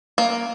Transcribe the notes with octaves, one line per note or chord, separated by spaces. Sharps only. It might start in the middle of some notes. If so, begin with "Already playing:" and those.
A#3